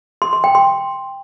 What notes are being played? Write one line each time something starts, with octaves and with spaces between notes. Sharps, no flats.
C6
C6
G5
C6